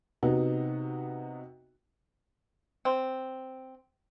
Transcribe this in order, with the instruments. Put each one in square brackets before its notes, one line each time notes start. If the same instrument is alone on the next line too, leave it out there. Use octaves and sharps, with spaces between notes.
[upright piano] C3 B3 D#4 F#4
[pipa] C4